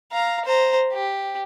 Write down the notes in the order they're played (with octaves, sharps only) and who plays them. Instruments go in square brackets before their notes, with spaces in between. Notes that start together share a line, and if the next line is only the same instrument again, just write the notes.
[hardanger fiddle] F5 A#5
C5 A#5
G4